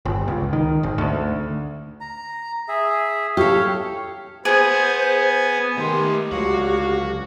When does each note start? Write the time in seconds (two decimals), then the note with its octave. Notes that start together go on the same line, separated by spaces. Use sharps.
0.05 G1
0.28 C#2
0.53 D#3
0.83 G#1
0.98 D2
2.00 A#5
2.68 G#4 E5
3.37 G4 A4 C#5 F5
4.45 B3 G#4 C5 G#5
5.77 D#3 A3 G4 C6
6.31 C#2 D3 F#3 F#4 F5